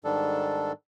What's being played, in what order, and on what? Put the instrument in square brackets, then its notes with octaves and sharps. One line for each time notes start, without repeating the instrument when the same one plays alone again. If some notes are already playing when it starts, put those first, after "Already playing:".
[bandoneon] G#2 D#3 G3 D4 A4